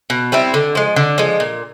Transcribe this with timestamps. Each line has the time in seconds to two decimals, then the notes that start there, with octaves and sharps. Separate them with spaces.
0.10 B2
0.32 G3 C4 E4
0.54 D3
0.75 F3 G#3
0.96 D3
1.18 F3 G#3
1.40 A#2